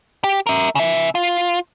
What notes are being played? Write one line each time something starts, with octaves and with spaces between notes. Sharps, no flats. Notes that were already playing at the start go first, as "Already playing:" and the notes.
G4
A#4 E5
C#3 E5
F4